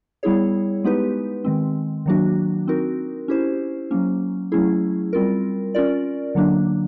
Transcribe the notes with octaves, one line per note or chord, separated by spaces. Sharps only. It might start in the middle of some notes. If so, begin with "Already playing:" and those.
G3 B3 E4 G#4 C#5
G#3 B3 D#4 G4 B4
D#3 G#3 C4
D#3 F#3 A#3 D4 F#4
C4 D#4 F#4 A#4
C#4 E4 G4 C5
F#3 A#3 C#4
F#3 A3 C#4 E4 G#4
G3 C4 F4 A#4
C#4 F4 A#4 D5
D3 F#3 A#3 D4